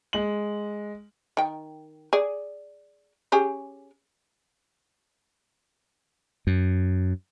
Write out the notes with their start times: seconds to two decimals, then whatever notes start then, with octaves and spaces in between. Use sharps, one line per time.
0.13 G#3 F#7
1.37 D#3 G5
2.13 G#4 D5
3.32 C#4 G4 G#4
6.47 F#2